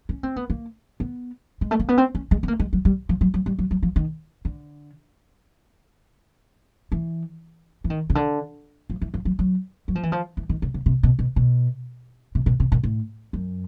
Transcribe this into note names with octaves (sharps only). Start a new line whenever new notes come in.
C#4
C4
B3
A#3
B3
G#3
A3
A#3
B3
C4
C#4
G#3
B3
A#3
G#3
F#3
G3
F3
F#3
F#3
G3
F#3
F#3
F3
D#3
D3
E3
E3
D#3
C#3
D3
F3
E3
F3
F#3
F#3
F#3
F3
E3
F3
E3
D#3
C#3
C#3
C3
B2
B2
B2
C3
B2
C3
A#2
A2
F#2